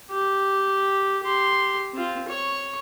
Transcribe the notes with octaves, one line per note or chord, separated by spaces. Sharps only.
G4
G4 C6
C4 F4
C#5 C#6